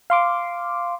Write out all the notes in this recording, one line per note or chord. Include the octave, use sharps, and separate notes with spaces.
F5 C6 D6